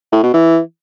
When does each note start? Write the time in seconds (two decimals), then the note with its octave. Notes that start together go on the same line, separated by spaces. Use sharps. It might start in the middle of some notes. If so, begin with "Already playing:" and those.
0.12 A2
0.23 B2
0.34 E3